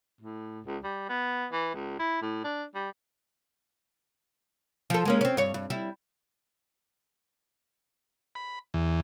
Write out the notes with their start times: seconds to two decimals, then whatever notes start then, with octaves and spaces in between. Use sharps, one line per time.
0.21 A2
0.66 C#2
0.83 G3
1.09 B3
1.52 E3
1.75 C#2
1.99 E4
2.22 A2
2.44 D4
2.75 G3
4.90 F3 A4
5.05 G#3 A#3 C#4
5.21 C4 C#4
5.37 G2 C#5
5.54 G2
5.70 G3 E4
8.35 B5
8.74 E2